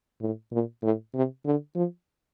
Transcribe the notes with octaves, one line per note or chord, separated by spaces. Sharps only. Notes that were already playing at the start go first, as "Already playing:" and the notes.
A2
A#2
A2
C3
D3
F3